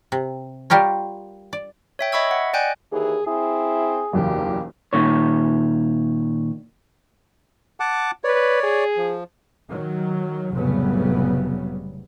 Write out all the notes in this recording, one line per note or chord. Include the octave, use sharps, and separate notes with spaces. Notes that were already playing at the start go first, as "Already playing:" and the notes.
C3
G3 F4 G4 A#4 C#5
D5
C#5 E5 G5
D#5 E5 B5 C#6 E6 G#6
F#5
D5 D#5 G5 G#5 F#6 G6
D#2 E3 G#4
C4 E4 G#4
F#1 B1 E2 A#3 G4
A#2 D#3 C#5
F#5 A5 D6
B4 C#5 D5
G#4
F3
D#3 F#3
F1 A2 C#3 F#3 G3 B3